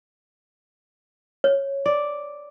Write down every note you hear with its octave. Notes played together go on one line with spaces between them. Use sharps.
C#5
D5